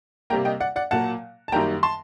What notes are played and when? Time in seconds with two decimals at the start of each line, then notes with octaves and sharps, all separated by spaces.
0.30 C3 G3 A#3 G5 A#5
0.45 D#5 G5
0.60 D5 F#5
0.76 D5 F#5
0.91 A#2 F#3 A#3 F#5 A5
1.48 A5
1.52 F#2 D#3 G3 A#3 G5 A#5
1.83 A5 C6